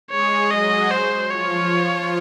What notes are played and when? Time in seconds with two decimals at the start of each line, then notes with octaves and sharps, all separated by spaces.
0.10 G#3 G#4 C#5
0.50 F#3 F#4 D#5
0.91 C5
1.31 F3 F4 C#5
1.71 F3 F4